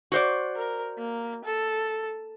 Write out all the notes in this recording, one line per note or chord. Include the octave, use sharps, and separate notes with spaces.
F#4 C5 D5
A#4
A#3
A4